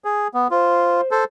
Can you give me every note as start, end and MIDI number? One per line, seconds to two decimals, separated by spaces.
0.04 0.28 68
0.34 0.48 59
0.51 1.01 65
0.51 1.08 72
1.11 1.24 69
1.11 1.24 72